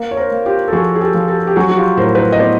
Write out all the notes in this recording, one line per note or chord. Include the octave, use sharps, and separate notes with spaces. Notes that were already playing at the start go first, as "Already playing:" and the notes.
Already playing: A#3
C#5
A#4 C5
A#3
F4 G4
A4
F3 F#4 G#4
G#4
G4 A4
F3
G4 A4
G4
F#3 F#4 G#4
F#4
F4 G4
A2 A#4 C5
B4
A#4 C5
D#5
B3 C5 D5